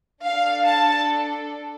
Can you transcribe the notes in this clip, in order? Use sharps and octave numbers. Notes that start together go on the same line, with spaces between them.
D4 A4 F5
A5